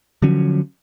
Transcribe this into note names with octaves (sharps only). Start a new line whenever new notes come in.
D3 F3 F#3 C#4